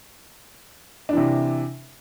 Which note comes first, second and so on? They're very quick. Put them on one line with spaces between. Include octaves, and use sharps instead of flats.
D4 E3 C3